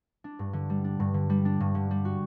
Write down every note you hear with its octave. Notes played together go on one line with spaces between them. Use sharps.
D4
G2
D3
G3
D4
G2
D3
G3
D4
G2
D3
G3
F#4